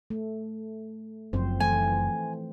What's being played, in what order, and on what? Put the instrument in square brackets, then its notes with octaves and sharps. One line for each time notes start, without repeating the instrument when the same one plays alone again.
[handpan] A3
[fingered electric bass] F#1 F#2 [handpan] F3 C4 C5
[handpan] E3 A3 [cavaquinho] G#5